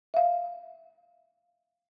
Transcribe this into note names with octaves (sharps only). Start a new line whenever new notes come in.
E5 F5